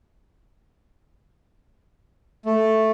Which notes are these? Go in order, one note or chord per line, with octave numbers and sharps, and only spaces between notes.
A3